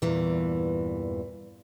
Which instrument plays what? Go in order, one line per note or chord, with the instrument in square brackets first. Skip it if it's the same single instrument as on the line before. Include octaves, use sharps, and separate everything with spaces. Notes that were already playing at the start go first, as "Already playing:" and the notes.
[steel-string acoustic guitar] E2 G2 A#2 E3